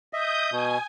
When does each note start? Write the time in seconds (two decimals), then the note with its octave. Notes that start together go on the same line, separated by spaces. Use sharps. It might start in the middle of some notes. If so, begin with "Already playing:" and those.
0.13 D#5 E5 D#6 G6
0.52 B2 G#5